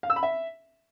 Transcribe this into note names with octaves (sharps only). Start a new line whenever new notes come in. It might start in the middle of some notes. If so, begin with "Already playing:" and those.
F5
E6
B5
E5